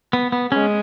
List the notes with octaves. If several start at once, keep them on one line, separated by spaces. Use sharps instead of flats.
B3
B3
G#3 C#4